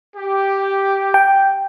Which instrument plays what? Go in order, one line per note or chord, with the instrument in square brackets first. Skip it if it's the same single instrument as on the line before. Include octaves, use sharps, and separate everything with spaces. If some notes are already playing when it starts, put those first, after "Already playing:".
[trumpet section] G4
[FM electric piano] G5